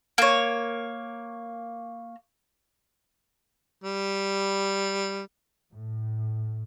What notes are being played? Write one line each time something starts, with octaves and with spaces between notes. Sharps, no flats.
A#3 C#5
G3
A2